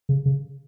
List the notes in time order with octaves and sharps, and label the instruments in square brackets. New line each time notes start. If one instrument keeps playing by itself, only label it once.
[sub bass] C#3
C#3